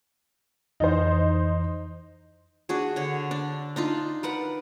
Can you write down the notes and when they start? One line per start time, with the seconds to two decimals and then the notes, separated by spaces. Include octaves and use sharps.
0.80 F2 E3 D#4 C5
2.69 D4 F#4 G#4
2.96 D3 C#5
3.31 D4
3.76 D4 D#4 F4
4.23 A#4 B4 F#5 A#5